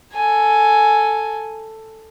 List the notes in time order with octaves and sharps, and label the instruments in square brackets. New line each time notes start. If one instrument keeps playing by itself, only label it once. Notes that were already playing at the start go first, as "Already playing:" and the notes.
[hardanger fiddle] A4 G#5